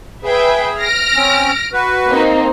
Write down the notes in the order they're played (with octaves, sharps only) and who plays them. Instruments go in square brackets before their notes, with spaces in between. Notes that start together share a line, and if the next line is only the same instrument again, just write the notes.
[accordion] G#4 [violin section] B4 E5 G5
[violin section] F6 A#6 D7
[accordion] C4 C#4
F#4 B4
[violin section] A#3 C4 D#4